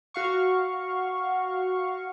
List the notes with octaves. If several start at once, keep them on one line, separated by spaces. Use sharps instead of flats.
F#4 F5 C#6